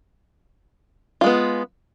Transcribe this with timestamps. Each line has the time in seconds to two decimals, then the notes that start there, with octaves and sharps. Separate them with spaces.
1.21 F4
1.24 G#3
1.26 B3